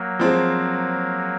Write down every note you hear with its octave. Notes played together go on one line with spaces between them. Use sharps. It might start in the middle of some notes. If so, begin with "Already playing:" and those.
Already playing: F#3 A#3
F3 G#3 C4